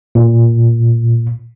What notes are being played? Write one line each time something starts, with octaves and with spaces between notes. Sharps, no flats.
A#2